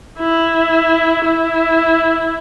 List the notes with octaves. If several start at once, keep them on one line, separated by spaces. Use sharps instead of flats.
E4
E4